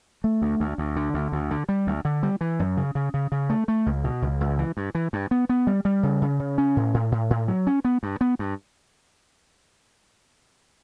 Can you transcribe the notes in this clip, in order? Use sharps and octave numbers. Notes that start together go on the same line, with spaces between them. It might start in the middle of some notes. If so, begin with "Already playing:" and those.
A3
D2
D2
D2
D3
D2
D2
D3
G3
D2
D3
G3
E3
F#2
C#3
C#3
C#3
C#3
A3
A3
C#2
B2
C#2
C#2
E3
G2
E3
G2
B3
B3
G3
G3
C#3
C#3
C#3
C#4
A2
A2
A2
A2
F#3
C#4
B3
G2
B3
G2